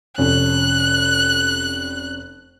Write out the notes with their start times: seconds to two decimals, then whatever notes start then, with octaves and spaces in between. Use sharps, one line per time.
0.18 F1 C#4 F#6